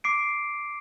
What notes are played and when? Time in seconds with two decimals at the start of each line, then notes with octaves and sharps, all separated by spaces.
0.04 D6 C7 D7